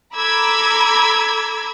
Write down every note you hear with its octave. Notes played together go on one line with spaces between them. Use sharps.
A4 A#5 B5 D6 E6 G#6